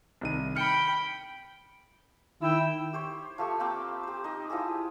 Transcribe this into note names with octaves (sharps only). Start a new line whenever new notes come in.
C2 D#3 D#7
G5 B5 F6 C#7
D#3 E4 G5 E6
G4 C5 C#5
F3 A3 G4 C#6
A#3 C4 G5 D6
G4 C5
D#4 D#5
F3 E4 G4 G#4